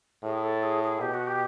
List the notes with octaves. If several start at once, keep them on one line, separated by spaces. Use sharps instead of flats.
A2 G#4
A4
G#4
G#4
B2 G4
F#4
G4